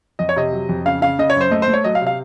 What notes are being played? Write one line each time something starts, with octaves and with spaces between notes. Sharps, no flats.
F2 D#5
C#5
C3 D#5
F#3
F2
C#3 F5
C#3 F5
C#3 D#5
C#5
F#2 C5
A3 D#5
C5
A3
C#5
F#3 D#5
F5
C3
F5